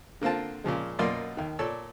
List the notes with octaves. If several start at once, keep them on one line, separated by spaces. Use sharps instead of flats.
D3 A#3 C4 F4 A5
A#2 C#3 F3 G#3
F#2 B2 A#3 F4 D5 C6
D#2 D#3
A#2 A4 C#5 D5 E6